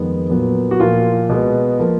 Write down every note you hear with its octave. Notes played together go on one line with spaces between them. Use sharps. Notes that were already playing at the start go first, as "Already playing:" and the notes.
Already playing: F2 D#3 G#3 B3
A#2 F#3 B3
F#4
A#2 F3 A#3 F4
B2 G#3 B3
F3 A#3